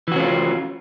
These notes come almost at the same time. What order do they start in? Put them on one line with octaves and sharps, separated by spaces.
E3 F#4 C#4 F4